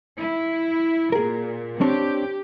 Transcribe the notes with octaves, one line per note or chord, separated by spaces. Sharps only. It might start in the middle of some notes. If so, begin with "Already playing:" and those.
E4
A#2 G#4 A#4
C4 D4 G4 C#5